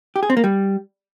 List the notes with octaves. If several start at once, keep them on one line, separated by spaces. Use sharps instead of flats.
G4
G#4
C4
A#3
G3